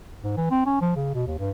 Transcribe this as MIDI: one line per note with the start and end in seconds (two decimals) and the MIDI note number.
0.24 0.33 44
0.37 0.49 52
0.51 0.62 60
0.66 0.82 61
0.82 0.92 53
0.96 1.11 49
1.14 1.26 47
1.27 1.38 39
1.39 1.51 43